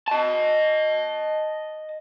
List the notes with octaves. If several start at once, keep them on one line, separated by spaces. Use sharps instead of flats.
D#5 A5